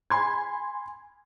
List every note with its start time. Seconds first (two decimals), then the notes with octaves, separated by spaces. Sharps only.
0.10 G#5 B5 C6 G#6